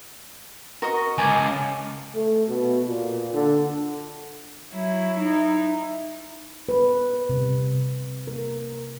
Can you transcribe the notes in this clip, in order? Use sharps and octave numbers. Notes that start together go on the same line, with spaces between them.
F#4 A#4 D#5 C#6
C#2 G#5 A5 D6
A3
B2
A#2
D3
F#3 E4
D#4 E4
B4
C3
A#4